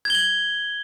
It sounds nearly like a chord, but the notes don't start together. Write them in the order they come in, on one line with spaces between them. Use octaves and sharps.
G#6 G7 F#7